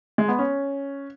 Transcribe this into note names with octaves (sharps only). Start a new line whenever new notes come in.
G#3
B3
C#4